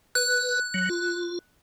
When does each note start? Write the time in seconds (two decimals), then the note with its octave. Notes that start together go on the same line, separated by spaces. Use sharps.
0.15 B4 F#6
0.74 F#3
0.89 F4